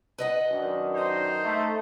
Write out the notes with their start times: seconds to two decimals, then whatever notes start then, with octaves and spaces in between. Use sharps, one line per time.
0.18 B4 D#5 F#5
0.51 F#2 D#3 D4
0.94 D#4 C5
1.44 A3